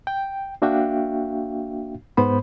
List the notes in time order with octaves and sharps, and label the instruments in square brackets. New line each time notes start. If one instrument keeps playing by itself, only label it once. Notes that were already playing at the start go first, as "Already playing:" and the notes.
[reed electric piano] G5
A#3 D4 F#4 E5 F5 G5
G#2 B3 C5 B5